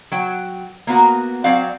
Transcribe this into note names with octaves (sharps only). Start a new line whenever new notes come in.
F#3 G5
A#3 B3 F#4 A#4
F#3 C4 D5 F5